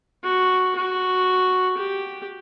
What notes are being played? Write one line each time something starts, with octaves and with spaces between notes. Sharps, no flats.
F#4
F#4
G4